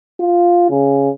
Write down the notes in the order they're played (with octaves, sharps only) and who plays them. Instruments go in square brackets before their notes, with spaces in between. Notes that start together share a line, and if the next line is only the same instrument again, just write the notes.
[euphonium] F4
C#3